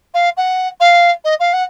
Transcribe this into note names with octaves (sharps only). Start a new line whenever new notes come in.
F5
F#5
F5
D#5
F5
F#5